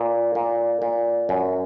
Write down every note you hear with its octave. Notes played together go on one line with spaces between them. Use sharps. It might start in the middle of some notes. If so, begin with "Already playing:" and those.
Already playing: A#2
A#2
A#2
F#2